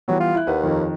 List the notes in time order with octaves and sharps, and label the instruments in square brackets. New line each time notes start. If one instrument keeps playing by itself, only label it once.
[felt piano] E3 G3 B3 [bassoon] F#3
[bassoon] F4
[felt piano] E4 F#6
[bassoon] D#2 [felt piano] B4 F#5
[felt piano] F2 D#3